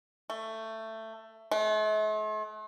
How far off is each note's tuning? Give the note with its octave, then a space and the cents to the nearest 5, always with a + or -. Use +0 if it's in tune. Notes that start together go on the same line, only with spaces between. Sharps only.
A3 +15
A3 -45